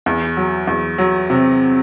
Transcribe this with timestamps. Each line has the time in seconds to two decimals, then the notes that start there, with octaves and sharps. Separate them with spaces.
0.06 E2
0.37 F#3
0.67 E2
0.98 F#3
1.30 C3